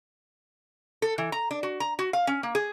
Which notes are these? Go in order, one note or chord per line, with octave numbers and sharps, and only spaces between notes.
A4
E3
A#5
D4
F#4
A#5
F#4
F5
C#4
A#3
G#4